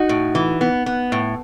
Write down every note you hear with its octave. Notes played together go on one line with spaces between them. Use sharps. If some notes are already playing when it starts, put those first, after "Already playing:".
Already playing: D#4 F#4
A2
E3
B3
B3
A2